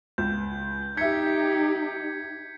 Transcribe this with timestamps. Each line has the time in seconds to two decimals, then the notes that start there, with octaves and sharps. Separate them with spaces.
0.18 C#2 G6
0.97 D#4 G4 E5 G6 G#6 B6 C#7